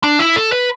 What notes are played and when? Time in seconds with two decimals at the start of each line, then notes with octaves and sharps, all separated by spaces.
0.03 D4
0.19 E4
0.36 A4
0.52 B4